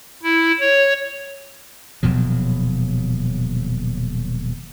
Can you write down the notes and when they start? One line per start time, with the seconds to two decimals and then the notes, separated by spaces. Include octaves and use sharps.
0.23 E4
0.60 C#5
2.03 D#1 B2 F3 F#3